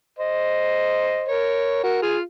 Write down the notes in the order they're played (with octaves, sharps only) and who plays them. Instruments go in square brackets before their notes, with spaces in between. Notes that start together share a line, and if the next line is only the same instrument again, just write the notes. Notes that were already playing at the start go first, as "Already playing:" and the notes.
[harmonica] C5 D#5
A#4 C#5
F#4 A#4
F4 G#4